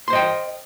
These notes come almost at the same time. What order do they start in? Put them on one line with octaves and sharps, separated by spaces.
C6 C5 D#5 G5